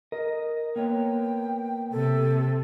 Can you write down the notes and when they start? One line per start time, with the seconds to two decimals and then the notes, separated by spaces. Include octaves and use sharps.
0.12 A#4 D#5
0.76 A#3 B3 C#5 G5
1.92 C3 A4